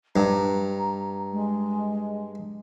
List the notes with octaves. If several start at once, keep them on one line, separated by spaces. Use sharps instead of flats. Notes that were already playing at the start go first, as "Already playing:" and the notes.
G2 A#5
G#3